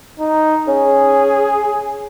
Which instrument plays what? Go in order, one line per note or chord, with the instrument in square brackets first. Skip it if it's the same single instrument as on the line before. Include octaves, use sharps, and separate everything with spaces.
[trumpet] D#4
[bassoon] C#4 [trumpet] G#4